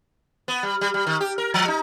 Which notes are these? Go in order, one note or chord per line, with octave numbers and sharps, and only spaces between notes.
B3
G3
G3
G3
D#3
G4
A#4
F3
D#4